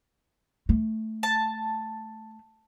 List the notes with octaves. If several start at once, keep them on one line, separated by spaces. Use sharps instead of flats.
A3
A5